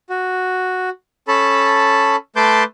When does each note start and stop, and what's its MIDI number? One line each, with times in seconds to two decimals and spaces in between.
0.10 0.89 66
1.28 2.16 61
1.28 2.16 69
1.28 2.16 81
1.28 2.16 83
2.36 2.64 57
2.36 2.64 71
2.36 2.64 81
2.36 2.64 84
2.36 2.64 86
2.36 2.64 91